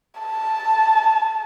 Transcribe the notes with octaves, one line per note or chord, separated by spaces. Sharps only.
A5